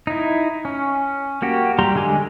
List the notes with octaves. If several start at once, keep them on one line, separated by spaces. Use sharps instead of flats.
D#4 E4
C#4
A#3 F#4 G4
G3 G4 A#5 C6
D3 G#3 G#5 D6